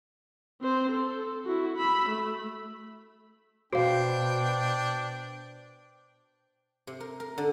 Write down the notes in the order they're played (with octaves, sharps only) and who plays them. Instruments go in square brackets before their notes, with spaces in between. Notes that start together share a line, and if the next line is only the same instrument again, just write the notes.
[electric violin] C4 C5
A4
E4 F#4
B5 E6
A3
[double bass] B2 [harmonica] D4 G5 [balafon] F#4 F5 [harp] C5
[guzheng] C3
A#4
A#4
D3